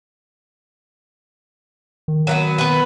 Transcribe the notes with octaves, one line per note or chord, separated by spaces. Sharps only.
D#3
F#3 A#3 B3
B3 B4